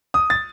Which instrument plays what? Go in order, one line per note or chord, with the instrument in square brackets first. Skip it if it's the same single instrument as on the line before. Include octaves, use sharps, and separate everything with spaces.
[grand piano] D#6
A6